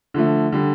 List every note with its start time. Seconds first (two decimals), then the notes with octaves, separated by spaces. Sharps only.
0.14 D3 F3 A3
0.52 D3 G3